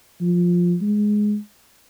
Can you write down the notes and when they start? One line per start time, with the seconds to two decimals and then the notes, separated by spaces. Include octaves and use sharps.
0.21 F3
0.82 G#3